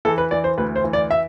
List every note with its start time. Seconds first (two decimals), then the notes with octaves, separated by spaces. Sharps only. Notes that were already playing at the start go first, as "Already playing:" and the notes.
0.05 E3 A4
0.18 B4
0.31 E3 D5
0.44 C5
0.58 D2 B4
0.76 C5
0.84 E3
0.93 D5
1.11 E5